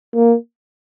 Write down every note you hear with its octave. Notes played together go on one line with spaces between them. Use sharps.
A#3